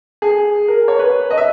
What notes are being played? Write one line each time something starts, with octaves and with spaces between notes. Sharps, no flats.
G#4
A#4
C#5
B4
D#5
E5